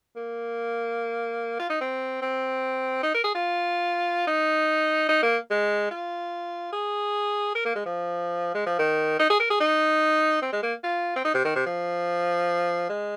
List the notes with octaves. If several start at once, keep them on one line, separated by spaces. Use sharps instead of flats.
A#3
F4
D#4
C4
C4
D#4
A#4
G#4
F4
D#4
D#4
A#3
G#3
F4
G#4
A#4
A#3
G#3
F3
G#3
F3
D#3
D#4
G#4
A#4
G#4
D#4
C4
G#3
A#3
F4
C4
D#4
C3
D#3
C3
F3
G#3